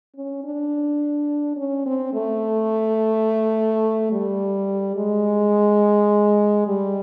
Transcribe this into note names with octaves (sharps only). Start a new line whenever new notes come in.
C#4
D4
C#4
C4
A3
G3
G#3
G3